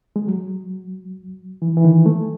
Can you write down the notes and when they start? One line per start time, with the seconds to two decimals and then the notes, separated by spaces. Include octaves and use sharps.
0.16 G#3
0.27 F#3
1.62 E3
1.77 E3
1.85 D#3
2.06 A3